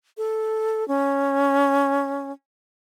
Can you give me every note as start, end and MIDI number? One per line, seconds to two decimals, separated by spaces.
0.17 0.86 69
0.88 2.32 61